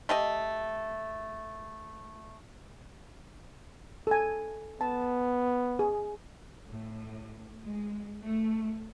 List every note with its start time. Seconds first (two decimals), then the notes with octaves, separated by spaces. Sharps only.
0.09 A3 G4 D#5
4.07 A4 G#5
4.81 B3 A5
5.79 G#4
6.68 A2
7.63 G#3
8.24 A3